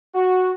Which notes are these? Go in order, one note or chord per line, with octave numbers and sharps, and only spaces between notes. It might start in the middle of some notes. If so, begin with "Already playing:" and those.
F#4